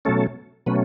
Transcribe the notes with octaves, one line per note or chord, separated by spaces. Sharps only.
B2 F#3 A3 C#4 A4
B2 F#3 A3 C#4 B4